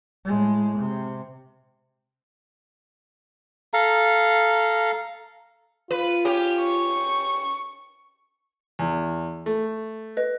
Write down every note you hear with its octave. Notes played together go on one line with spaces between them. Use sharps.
A2 G#3
C3
A4 F5 A#5
F4 B4
C#4 G4
C#6
E2
A3
B4 D#5